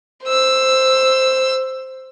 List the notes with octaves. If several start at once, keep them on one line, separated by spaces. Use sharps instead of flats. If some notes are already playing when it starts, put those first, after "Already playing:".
C5 E6